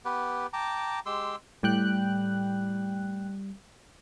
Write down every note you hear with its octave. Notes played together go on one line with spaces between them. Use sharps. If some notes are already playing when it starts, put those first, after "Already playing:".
B3 G4 B4
G5 A5 A#5 D6
G#3 G4 C6 E6
A2 G3 G5 F#6